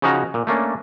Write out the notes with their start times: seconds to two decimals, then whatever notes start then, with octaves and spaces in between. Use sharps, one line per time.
0.02 C#3 F3 C#4 D#4 F#4 A#5
0.34 A#2
0.47 A3 A#3 C#4 D4